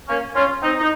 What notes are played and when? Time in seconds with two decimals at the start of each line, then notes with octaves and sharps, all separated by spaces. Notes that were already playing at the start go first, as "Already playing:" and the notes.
0.09 A#3 C#4
0.35 C#4 F4
0.62 C4 D#4
0.78 D#4